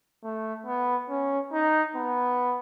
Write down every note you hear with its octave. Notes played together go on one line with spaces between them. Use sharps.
A3
B3
C#4
D#4
B3